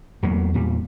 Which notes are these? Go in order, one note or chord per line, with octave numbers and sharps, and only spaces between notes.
E2 F#3 A3 A#3
E2 A#2 G3